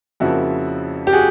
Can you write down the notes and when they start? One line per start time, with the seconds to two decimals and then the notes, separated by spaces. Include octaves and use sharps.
0.20 F2 C#3 F3 A#3 E4 F#4
1.07 G4
1.13 F#4 G#4